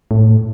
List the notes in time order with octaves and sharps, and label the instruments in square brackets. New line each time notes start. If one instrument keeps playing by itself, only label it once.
[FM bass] A2